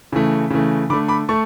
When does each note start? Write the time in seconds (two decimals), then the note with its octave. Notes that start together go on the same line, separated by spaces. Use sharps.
0.12 C#3 E3 A3
0.50 C#3 E3 A3
0.90 D3 B5 D6
0.93 A3
1.08 B5 D6
1.29 A3 A5 C#6